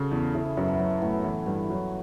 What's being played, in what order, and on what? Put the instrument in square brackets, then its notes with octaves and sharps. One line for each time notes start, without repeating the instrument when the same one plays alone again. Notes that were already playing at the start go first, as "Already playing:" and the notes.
Already playing: [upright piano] C#3 [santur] F#4 A4
[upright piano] E2
[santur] C#4
[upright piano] C#3 [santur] E4
[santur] C#4
[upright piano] F#2 [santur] B3
[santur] A3
[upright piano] F#3 [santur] C#4
[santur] C#4
[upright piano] A2 [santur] B3
[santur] B3
[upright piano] E3 [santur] B3
[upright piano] G2 [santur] B3
[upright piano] F#3